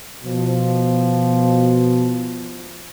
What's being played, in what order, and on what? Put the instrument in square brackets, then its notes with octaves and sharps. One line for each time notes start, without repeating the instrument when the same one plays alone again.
[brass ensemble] B2 F3